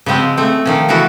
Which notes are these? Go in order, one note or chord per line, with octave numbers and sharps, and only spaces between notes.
C#3 F3 G#3 C4
A3 C4
D#3 F3 C#4
C#3 E3 B3 F#4 A4